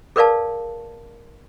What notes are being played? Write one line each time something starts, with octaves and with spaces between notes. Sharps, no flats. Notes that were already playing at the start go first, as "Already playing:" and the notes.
G#4 A#4 B4 D5 F5 A5